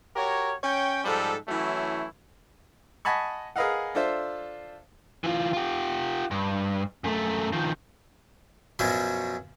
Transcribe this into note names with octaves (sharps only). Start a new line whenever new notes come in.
F#4 G4 A#4 C#5
C#4 C#5 G5
G#2 F3 G3 A4
E3 F#3 A3 C#4 E4
D#5 F#5 G#5 A5 B5 C#6
G#4 A#4 B4 D#5 F5 F#5
D4 F4 A4 C5 E5
E3 F4
F4 G4
G2
F#2 A3
D#3 F3
F#2 B2 F3 F#3